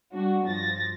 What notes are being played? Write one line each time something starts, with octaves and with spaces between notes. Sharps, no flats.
G3 D4 F#4
G2 F3 A6 A#6